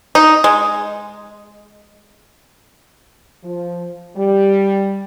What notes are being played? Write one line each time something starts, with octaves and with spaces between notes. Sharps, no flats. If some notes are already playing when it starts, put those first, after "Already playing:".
D#4
G#3
F3
G3